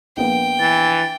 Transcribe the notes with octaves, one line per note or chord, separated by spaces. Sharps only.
A#1 A#3 B3 G5
E3 A6